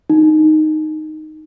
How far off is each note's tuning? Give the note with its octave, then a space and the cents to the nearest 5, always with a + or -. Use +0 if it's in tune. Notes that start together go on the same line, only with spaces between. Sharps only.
D#4 -5